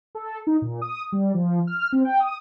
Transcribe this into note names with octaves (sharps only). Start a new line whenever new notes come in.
A4
D#4
A#2
D#6
G3
F3
F6
C4
G5
D#6